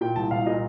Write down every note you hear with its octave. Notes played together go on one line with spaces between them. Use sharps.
A#2 G5
C2 A5
C2 F5
A#2 D#5